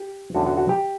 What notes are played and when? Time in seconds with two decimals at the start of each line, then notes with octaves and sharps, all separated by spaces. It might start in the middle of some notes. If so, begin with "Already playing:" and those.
Already playing: G4
0.34 E2 D3 A3 C#4 F#4
0.46 F#4
0.57 F#4
0.69 G4